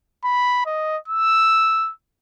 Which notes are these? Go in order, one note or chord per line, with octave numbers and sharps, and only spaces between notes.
B5
D#5
E6